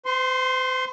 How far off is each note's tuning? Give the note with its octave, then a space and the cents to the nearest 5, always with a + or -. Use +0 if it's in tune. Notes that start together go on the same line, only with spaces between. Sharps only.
C5 -40 C6 +5